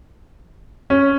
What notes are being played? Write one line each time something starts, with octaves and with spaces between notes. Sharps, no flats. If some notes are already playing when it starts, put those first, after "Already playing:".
C#4